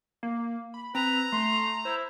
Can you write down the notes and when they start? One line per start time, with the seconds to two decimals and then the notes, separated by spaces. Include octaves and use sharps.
0.23 A#3
0.74 B5
0.95 C4 B4 A#5
1.32 A3 C6
1.85 E4 C5